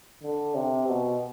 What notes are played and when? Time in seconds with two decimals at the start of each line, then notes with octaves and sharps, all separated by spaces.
0.23 D3
0.55 C3
0.87 B2